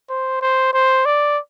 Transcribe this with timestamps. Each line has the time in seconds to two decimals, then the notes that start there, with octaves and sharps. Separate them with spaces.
0.10 C5
0.41 C5
0.73 C5
1.05 D5